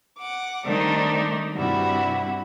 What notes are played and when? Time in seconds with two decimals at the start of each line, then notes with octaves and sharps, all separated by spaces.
0.17 F#5 D6
0.64 D#3 G3 A3 C4 D4 D#4
1.54 G2 C3 G3 E4 F#4